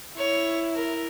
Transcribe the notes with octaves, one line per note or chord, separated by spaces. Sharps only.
E4 C#5
A#4